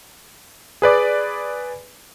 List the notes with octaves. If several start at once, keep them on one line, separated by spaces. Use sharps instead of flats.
G#4 B4 D5 D6